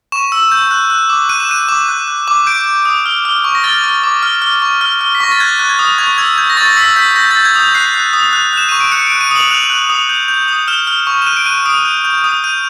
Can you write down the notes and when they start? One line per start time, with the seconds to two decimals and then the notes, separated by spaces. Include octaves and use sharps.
0.12 C#6 E7
0.32 E6
0.52 G6
0.71 F#6
0.90 F#6
1.09 D6
1.29 F#6 D#7
1.40 E7
1.49 F#6 D#7
1.69 D6
1.89 F#6
2.08 F#6
2.28 D6
2.46 G6 D7
2.66 G6
2.85 D#6
3.06 F6
3.25 F6
3.44 C#6
3.55 A#6
3.64 F6 A6
3.84 F6
4.04 D6
4.23 F6
4.42 F6
4.62 C#6
4.81 F6
5.01 F6
5.15 B6
5.20 C#6 A#6
5.32 A6
5.40 F#6 G#6
5.59 F#6
5.70 G#6
5.79 D#6
5.98 C#6 G#6
6.18 E6 G#6
6.38 G6 G#6
6.50 A#6
6.57 C#6 A6
6.68 A#6
6.77 E6 B6
6.96 G6 B6
7.16 G6 A#6
7.31 G6 A6
7.45 G#6
7.56 D#6 G6
7.75 F#6 C7
7.94 F#6
8.13 D#6
8.33 F#6
8.53 F#6 E7
8.69 C#6 D#7
8.80 D7
8.92 F#6 C#7
9.07 F#6 D7
9.21 D#7
9.31 D#6 F#7
9.50 F#6 F7
9.70 F#6
9.90 D#6
10.09 G6
10.28 G6
10.48 D#6
10.68 F6 E7
10.87 F6
11.07 C#6
11.22 E7
11.26 F#6 D#7
11.37 D7
11.46 F#6 D#7
11.66 D#6 D7
11.85 G6
12.05 G6
12.24 D#6
12.44 G6 D#7